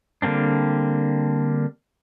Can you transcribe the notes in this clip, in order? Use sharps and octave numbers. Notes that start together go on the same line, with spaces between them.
D3 G3 A#3 C4 D4